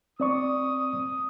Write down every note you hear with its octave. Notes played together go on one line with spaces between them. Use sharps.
C4 D5 C#6 D#6